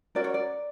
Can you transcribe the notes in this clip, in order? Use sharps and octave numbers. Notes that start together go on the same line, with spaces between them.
C#4 F#4 A#4 D5
C#5
D5